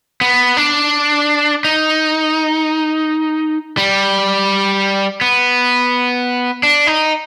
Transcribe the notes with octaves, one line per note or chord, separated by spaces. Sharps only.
B3
D4
D#4
G3
B3
D4
D#4